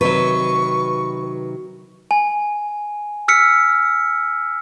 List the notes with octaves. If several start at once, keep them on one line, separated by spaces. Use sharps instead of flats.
C3 D#3 F#3 B4 C#6
G#5
E6 F6 B6 C#7